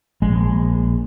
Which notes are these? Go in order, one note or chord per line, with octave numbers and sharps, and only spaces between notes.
A#1 G#3